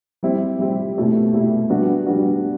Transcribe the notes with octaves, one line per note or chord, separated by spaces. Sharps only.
G3 C4 E4 G4
G3 C4 E4 G4
B2 A3 E4 G4
B2 A3 E4 G4
G3 B3 D4 F#4
G3 B3 D4 F#4